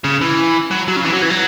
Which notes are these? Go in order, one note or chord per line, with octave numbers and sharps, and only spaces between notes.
C#3
E3
F#3
F#3
C#3
E3
F#3
E3
F#3